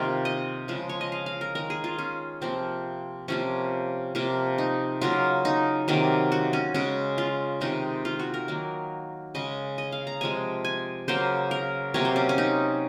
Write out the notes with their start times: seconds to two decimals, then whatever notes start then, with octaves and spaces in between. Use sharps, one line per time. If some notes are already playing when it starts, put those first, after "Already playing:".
Already playing: C3 D#3 A#3 F4
0.25 D#5
0.68 C#3 F3 G#3
0.89 C#5
1.01 D#5
1.12 F5
1.26 F5
1.41 A#4
1.55 D#3 G#3 A#4
1.70 G#4
1.84 F4
1.98 C#4
2.41 C3 F3 A#3 C4
3.28 C3 F3 A#3 C#4
4.15 C3 F3 A#3
4.58 D#4
5.01 C#3 F#3 A#3 F4
5.45 D#4
5.88 C3 D#3 F#3 A#3
6.32 F#4
6.53 C#4
6.74 C#3 G#3 C#4
7.18 F4
7.61 C3 D#3 G#3 D#4
8.05 F4
8.19 F#4
8.34 A#4
8.48 D#3 F#3 A#3
9.35 C#3 G#3 D#5
9.78 D#5
9.92 F5
10.07 A#5
10.21 C3 F3 G#3 G#5
10.65 G#5
11.08 C#3 F#3 A#3 C5
11.51 A#4
11.94 C3 F#3 A#3 C#5
12.05 C5
12.16 C#4
12.29 C#4
12.38 D#4